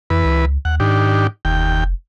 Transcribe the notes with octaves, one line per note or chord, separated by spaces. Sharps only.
F2 E3 B4
C#2
D#2 F#5
G#2 D#3 D4 G4
F1 D#2 G5